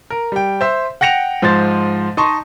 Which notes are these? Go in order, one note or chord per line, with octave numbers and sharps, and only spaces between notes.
A#4
G3 G5
C5 E5
F#5 G5 A#6 C#7 F7
G#2 F3 C5 A6
D#4 D#5 A5 C6 C#6